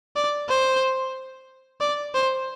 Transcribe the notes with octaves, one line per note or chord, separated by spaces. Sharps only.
D5
C5
D5
C5